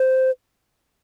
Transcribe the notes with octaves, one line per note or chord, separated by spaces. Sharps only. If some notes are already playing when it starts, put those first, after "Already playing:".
Already playing: C5